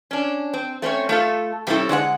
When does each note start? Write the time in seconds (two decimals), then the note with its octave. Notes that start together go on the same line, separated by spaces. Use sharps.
0.11 C#4 D4
0.53 C4
0.82 A3 C4 C#4 C#5
1.09 A3 F4 A4
1.67 C3 G3 C4 C#4 E4 A4
1.89 D3 G#3 C#5 F#5